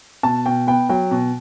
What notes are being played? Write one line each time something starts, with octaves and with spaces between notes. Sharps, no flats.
B2 A5
B2 G5
B3 G5
F#3 G5
B2